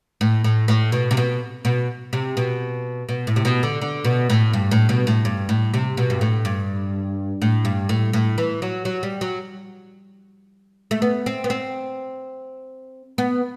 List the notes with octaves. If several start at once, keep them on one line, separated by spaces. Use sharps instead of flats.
A2
A2
A2
B2
C3
B2
B2
C3
B2
B2
A2
C3
B2
D3
D3
B2
A2
G2
A2
B2
A2
G2
A2
C3
B2
G2
A2
G2
A2
G2
A2
A2
E3
F#3
F#3
G3
F#3
A3
B3
C4
B3
C4
B3